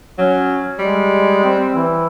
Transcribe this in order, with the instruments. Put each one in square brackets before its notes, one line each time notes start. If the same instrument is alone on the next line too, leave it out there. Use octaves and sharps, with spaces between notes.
[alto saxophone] F#3 [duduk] C#4
[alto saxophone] G3 [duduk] G#3
[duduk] C4
E3